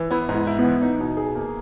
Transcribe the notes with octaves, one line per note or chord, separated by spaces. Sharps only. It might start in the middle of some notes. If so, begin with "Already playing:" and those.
Already playing: E3
B3 E4
G#2
E4
E4
B3
E3
D#4
B2
G#4
A#3